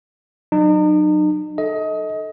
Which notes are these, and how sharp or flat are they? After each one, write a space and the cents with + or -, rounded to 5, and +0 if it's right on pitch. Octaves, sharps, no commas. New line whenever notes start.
F#3 +5 D#4 -40
A4 +0 D#5 +25